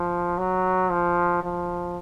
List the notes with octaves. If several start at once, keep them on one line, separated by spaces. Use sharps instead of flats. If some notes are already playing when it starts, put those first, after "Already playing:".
Already playing: F3
F#3
F3
F3